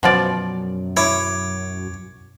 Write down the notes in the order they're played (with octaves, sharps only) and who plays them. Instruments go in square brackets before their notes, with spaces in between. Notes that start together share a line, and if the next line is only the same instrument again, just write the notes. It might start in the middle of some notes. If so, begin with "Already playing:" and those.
[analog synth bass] F#2 [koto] B2 F3 D5
[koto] E4 [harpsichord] C#5 D6